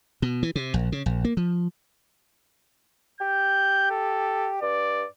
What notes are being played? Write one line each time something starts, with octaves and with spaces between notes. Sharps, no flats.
B2
E3
C3
A#1
C#3
A#1
A#3
F3
G4 G6
A4
G2 D5